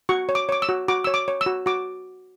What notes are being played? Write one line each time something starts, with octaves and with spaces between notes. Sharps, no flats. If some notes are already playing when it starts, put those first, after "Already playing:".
F#4 C#6
C#5
D6
C#5 D6
E6
F#4
F#4 D6
C#5 E6
D6
C#5
E6
F#4
F#4 D6